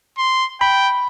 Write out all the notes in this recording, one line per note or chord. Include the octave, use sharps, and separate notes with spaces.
C6
G5 B5